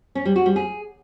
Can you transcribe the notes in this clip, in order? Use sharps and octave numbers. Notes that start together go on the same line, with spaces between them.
C#4
G3
F#4
G3
G#4